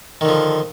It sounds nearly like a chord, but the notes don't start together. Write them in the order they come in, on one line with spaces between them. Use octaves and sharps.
D#3 D3 F3